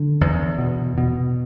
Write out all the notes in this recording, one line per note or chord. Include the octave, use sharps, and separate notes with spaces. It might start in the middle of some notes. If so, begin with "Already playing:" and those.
Already playing: D3
E2
B2
B2